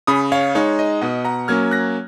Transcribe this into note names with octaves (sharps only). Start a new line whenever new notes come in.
C#3 B5 D#6
C#5 F5
G#3 D#4 C#5
D#5
B2 D#5 F#5
F#5 A#5
F#3 A#3 C#4 F6 G#6
F#6 A#6